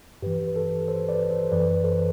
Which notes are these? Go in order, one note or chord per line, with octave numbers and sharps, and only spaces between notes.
G2 E3 G4 B4
B4
A4
A4 C5
B4 D5
A4 C5
F#2 E3 B4 D5
A4 C5